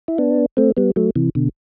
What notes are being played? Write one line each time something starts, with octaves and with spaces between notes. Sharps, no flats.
E4
B3 D4
A3 C4
G3 B3
F#3 A3
C3 E3
B2 D3